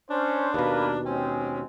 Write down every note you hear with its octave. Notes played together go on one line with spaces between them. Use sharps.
C#4 D4 C5
D#2 B2 A#3 B4
G#3 C4 C#4